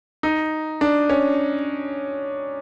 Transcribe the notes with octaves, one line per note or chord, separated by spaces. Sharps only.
D#4
D4
C#4